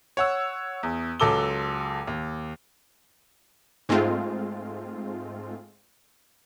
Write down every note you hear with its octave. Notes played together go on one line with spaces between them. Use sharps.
C#5 F#5 E6
E2
C#2 F#3 A4 D6 E6 G7
D#2
G#2 G#3 A3 C4 F4